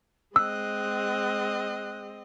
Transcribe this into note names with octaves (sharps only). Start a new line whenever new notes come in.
G#3 C4 D#5 E6 F#6